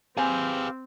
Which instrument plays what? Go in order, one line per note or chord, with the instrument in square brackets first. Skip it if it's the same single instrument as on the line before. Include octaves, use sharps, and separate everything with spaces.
[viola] C4 [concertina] G4 F5 [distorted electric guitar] G#4 B4 [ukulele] C5 G#5